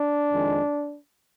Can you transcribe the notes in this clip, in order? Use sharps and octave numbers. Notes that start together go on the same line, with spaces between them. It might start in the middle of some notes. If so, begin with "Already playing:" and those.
Already playing: D4
F2 D#3 G#3